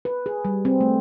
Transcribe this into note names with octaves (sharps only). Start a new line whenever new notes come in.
B4
G#4
G3
C4
A3